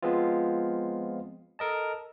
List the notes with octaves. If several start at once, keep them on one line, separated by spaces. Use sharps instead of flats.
F3 G#3 B3 C4 F4
A4 A#4 D#5 A5